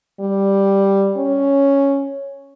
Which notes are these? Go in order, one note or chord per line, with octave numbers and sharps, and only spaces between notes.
G3
C#4